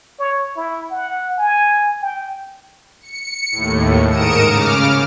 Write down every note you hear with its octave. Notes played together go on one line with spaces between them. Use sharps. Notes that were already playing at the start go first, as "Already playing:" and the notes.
C#5
E4
F#5
G#5
G5
C#7
D#2 A2
G#2 A#4 D#6 C#7 D7 E7
C#3 D6 F6